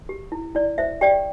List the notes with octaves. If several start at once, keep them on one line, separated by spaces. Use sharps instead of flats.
G4
E4
E4 D5
C5 E5
G4 D5 G5